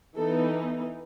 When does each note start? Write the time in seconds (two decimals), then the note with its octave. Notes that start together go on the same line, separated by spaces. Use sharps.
0.15 E3 B3 D#4 A4